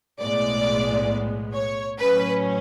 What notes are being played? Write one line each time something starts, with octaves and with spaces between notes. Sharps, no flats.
B1 A2 G#3 B3 D5
C#5
A2 F#3 C#4 B4